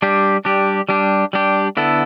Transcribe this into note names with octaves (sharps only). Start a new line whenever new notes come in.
G3 D4 G4
G3 D4 G4
G3 D4 G4
G3 D4 G4
D3 B3 E4 A4